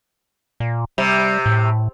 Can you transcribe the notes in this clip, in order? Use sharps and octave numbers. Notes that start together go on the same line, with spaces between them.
A#2
C3 G3
A2